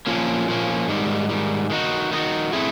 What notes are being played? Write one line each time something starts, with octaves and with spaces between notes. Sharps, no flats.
A#2 F3 A#3 C#4
A#2 F3 A#3 C#4
G#2 D#3 G3
G#2 D#3 G3
D#3 G3 A#3 D#4 F#4
D#3 G3 A#3 D#4 F#4
A3 C4 E4 G#4